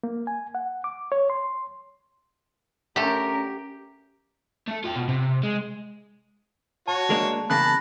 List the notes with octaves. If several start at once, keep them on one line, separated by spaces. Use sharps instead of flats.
A#3
G#5
F#5
D6
C#5
C6
D3 A3 C#4 G4 A#4
A3 A4
F4 G5
B2
C3
G#3
F#4 C#5 A5
G#3 A#3 D4
E2 C#3 A#3 A5 B5 F#6 A#6